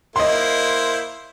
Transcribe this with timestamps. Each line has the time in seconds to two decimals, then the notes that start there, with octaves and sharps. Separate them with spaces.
0.16 A#3 E4 C5 D#5 C6